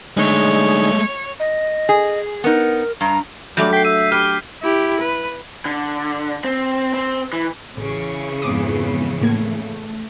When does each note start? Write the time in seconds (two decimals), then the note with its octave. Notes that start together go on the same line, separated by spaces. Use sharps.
0.17 D3 G#3 A3 D#4 G#4 C#5
1.40 D#5
1.89 G#4
2.44 B3 D#4 A#4
3.01 G2 A#5
3.57 F#3 G3 A3 D4 G6
3.73 G5 B6 C7
3.85 E5 D#7
4.12 G4 B4 F6
4.62 E4 G4
5.00 B4
5.65 D3
6.44 C4
6.94 C4
7.33 E3
7.77 A1 C#3 E3 C#6
8.42 F2 G#2 B3 D6 D#6
9.21 A2 A3 A#3 G#6